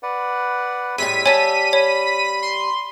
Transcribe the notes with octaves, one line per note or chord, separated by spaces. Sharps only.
B4 D5 F#5
A2 G3 G#3 E5 B6 D#7
G3 C#5 G#5 A5
C#5 B5
C6